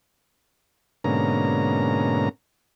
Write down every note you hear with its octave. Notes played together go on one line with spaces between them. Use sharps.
G#2 B2 D3 A#3 C#4 A#5